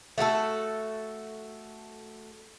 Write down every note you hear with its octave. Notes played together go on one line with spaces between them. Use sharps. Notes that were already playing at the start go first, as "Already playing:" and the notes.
A3 F#4 G4 A4